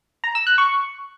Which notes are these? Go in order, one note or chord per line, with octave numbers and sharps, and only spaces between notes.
A#5
E6
F#6
C#6